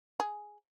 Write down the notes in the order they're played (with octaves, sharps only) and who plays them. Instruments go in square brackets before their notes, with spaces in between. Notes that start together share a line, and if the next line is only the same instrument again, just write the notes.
[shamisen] G#4